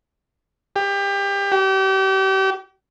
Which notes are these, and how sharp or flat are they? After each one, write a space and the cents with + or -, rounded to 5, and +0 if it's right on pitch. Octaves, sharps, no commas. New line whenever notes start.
G4 +25
G4 -35